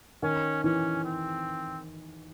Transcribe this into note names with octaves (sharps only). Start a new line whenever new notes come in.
D#3 C#4
E3 C#4
C4